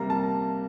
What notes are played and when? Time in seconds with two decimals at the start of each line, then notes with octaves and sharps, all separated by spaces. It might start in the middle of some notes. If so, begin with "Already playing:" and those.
Already playing: C3 G3 A#3 A#5
0.10 A5